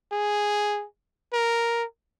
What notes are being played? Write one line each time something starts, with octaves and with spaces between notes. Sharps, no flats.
G#4
A#4